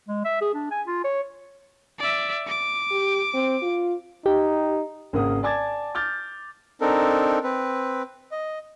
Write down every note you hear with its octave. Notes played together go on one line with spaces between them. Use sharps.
G#3
E5
G#4
D4
G#5
F4
C#5
D5 E5
D6
G4
C4
F4
D#4 G4
G#1 C#3 A#3 A#4 F#5 D#6
D5 G#5 A5 D6 G#6 A6
D6 F6 G6 A6
C4 D4 D#4 A4 A#4
C4 B4
D#5